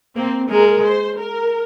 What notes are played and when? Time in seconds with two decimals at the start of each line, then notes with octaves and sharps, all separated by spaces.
0.16 A#3 C4
0.50 G#3 A#4
0.84 C5
1.17 A#4